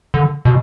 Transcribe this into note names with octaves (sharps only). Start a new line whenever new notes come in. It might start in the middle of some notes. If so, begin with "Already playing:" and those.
D3
B2